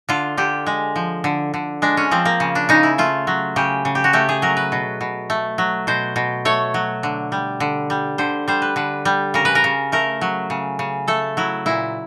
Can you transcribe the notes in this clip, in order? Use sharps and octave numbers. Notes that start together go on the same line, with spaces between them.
D3 F4
D3 G4
G#3
F3
D3
D3
G#3 D4
C#4
F3 C4
A#3
C#3
D4
C#3 D#4
E4
A3 F4
F#3
C#3 G4
C#3
G4
F#4
A3 G4
G#4
F#3 A#4
B4
B2
B2
A3
F#3
B2 C5
B2
A3 C#5
F#3
D3
G3
D3
G3
D3 C5
G3 C5
B4
D3 B4
G3
C#3 A#4
B4
A#4
C#3
A3 A#4
F#3
C#3
C#3
A3 A4
F#3 E4
A#2 E4